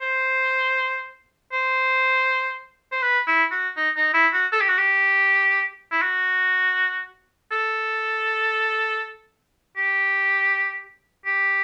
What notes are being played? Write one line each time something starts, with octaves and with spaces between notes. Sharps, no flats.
C5
C5
C5
B4
E4
F#4
D#4
D#4
E4
F#4
A4
G4
F#4
G4
E4
F#4
A4
G4
G4